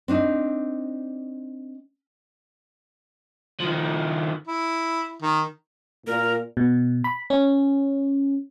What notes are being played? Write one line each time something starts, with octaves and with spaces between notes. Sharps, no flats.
C4 D4 D#4
D#3 F3
E4
D#3
A#2 A#4
B2
B5
C#4